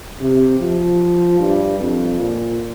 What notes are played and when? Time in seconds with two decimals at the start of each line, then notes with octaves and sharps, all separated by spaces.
0.20 C3
0.60 F3
1.39 G2
1.79 F2
2.20 A#2